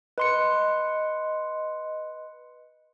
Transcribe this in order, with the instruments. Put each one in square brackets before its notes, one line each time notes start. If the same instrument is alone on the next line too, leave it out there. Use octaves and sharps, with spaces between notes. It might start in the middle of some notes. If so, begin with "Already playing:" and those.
[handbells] B4 C6 C#7 [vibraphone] D#5